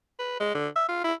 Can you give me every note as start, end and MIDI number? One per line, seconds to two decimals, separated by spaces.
0.19 0.38 71
0.40 0.54 56
0.55 0.68 50
0.76 0.84 76
0.89 1.03 65
1.04 1.14 64